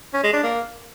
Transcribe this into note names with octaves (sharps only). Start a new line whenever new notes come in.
C#4
G#3
D4
A#3